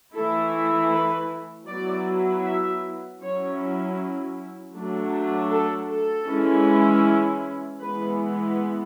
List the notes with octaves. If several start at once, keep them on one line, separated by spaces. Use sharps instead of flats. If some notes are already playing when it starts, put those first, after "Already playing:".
E3 A3 E4 A4
B4
F#3 B3 E4 D5
E5
F#3 C#4 E4 C#5
F#3 A3 D4
A4
A4
E3 G#3 C#4 E4
E3 G#3 B3 B4